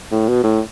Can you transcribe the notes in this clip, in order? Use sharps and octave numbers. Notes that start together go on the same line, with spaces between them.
A2
B2
A2